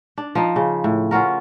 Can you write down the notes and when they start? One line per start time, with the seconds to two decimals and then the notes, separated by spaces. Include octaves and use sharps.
0.17 D4
0.35 F3 D#4
0.56 C#3
0.84 A2
1.11 C#4 F4 F#4 A#4